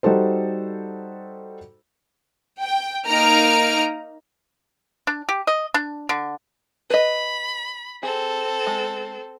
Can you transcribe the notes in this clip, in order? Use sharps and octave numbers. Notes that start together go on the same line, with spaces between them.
G3 D#4 F#4 A4 C5
G5
A#3 D#4 A#5 F6 D7
D4
G4
D#5
D4
D3
B4 D#5 B5
C4 G#4 A4
G#3